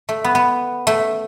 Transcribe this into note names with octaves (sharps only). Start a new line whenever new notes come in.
A3
B3
B3
A3